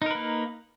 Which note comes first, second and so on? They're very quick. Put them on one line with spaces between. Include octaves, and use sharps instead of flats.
D#4 A#4 B4 A#3